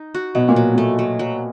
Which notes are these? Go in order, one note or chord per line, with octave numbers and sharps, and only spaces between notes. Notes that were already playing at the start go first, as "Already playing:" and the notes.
Already playing: D#4
F#4
B2 F#3
A#2
F#3
A#2 A3
F#3
F#3